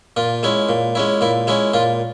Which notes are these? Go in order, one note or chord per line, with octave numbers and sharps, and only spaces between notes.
A#2 F4
G#3 C#4 E4
A#2
G#3 C#4 E4
A#2 E4
G#3 C#4 E4
A#2 F4